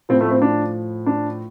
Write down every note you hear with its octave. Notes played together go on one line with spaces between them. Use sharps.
A2 F3 C4
A3
C4
D4
D4